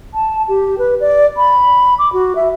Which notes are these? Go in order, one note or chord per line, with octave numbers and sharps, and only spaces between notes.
A5
G4
B4
D5
B5
D6
F#4
E5